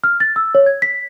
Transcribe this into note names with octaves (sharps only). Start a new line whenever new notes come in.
F6
A6
E6
C#5
G#6
B6